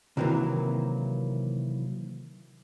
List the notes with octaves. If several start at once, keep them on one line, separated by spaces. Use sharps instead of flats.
C3 D#3 E3 F#3 A#3